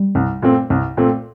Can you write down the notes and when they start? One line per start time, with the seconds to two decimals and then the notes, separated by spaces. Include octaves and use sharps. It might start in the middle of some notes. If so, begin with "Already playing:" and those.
Already playing: G3
0.15 C2
0.42 A#2 A3 C4
0.70 C2
0.97 A#2 A3 C4